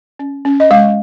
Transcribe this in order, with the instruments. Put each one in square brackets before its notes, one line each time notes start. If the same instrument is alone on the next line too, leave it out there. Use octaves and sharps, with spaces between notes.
[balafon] C#4
C#4
D#5
G#3 F5